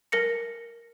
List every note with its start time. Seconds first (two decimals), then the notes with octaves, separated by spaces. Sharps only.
0.12 A#4 A#6 C#7